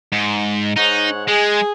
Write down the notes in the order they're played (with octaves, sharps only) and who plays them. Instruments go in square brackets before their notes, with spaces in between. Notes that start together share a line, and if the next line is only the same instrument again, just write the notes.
[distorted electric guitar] G#2
[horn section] G#2 C#5 F#5 [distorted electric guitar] D#4
[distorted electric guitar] G#3 [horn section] G#4